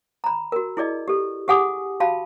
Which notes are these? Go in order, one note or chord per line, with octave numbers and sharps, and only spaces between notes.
A#5 B5
F#4 A#4
E4 G#4 D5 D#5
G4 A4
G4 G#4 F#5 G#5 D6 D#6
F#4 F5 A5 B5